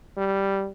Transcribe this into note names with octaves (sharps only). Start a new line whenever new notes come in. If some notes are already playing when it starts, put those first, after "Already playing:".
G3